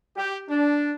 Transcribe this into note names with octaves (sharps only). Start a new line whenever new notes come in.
G4
D4